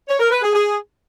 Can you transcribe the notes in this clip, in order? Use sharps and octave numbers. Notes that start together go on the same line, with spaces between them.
C#5
A#4
B4
G#4
G#4